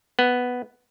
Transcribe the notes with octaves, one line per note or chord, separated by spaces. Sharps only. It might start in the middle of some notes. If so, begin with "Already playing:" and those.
B3